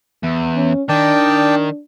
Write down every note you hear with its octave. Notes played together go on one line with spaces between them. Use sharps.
E2
C#4
D#3 D4 D5 G5 A5